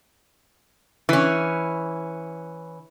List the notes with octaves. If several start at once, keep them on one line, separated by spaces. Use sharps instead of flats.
E3 C#4